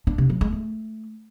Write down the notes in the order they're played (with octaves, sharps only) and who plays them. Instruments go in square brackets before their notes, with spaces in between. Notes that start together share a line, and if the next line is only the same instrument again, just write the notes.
[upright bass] D4
C3
F#3
G#3
A3